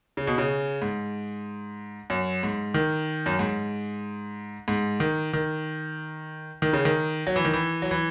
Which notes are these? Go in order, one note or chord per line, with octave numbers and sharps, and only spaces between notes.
C#3
B2
C#3
G#2
F#2
G#2
D#3
F#2
G#2
G#2
D#3
D#3
D#3
C#3
D#3
F#3
E3
D#3
E3
F#3
E3